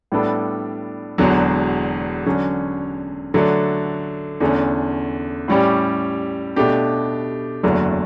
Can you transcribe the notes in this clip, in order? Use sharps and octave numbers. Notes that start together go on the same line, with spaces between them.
A2 G3 B3 D4 A4
E1 E2 D3 F#3
D3 F#3 C#4
D3 F#3 A3
E2 D3 A3 C#4
A2 G3 C#4 G4 D5
B2 A3 D4 G4
F#1 E2 D3 F#3 A3